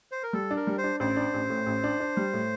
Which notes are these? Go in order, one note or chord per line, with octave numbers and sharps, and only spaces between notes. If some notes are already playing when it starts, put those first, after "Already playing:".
C5
A#4
G3 A4
D4
A#4
G3
C5
D4
A1 C5
D4
A1
A2
A1
D4
D4
G3
A2